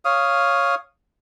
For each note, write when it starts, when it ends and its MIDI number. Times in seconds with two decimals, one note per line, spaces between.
0.05 0.75 73
0.05 0.75 77
0.05 0.75 87